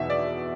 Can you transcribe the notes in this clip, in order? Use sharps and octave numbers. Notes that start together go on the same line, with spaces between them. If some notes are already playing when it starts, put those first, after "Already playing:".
Already playing: E2 B2 E5
D5